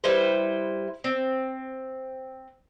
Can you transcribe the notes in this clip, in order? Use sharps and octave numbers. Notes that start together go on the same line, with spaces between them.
G3 E4 B4 C5
C4